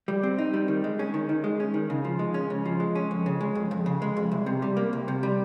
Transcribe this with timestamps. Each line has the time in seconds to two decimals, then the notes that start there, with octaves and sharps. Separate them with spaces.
0.08 G3
0.23 C4
0.38 D#4
0.54 G3
0.68 D#3
0.84 G#3
0.99 C#4
1.14 D#3
1.29 D#3
1.44 G#3
1.60 C#4
1.74 D#3
1.90 C#3
2.05 F3
2.19 G#3
2.34 C#4
2.50 C#3
2.65 F3
2.80 G#3
2.95 C#4
3.11 F2
3.26 C#3
3.41 G#3
3.55 F2
3.71 F2
3.86 C#3
4.02 G#3
4.17 F2
4.32 C2
4.46 C3
4.62 G3
4.77 A#3
4.93 C2
5.08 C3
5.23 G3